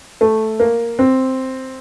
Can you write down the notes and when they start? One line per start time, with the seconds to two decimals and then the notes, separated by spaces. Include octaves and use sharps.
0.21 A3
0.60 A#3
0.99 C4